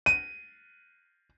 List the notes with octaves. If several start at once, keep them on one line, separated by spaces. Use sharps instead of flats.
D#7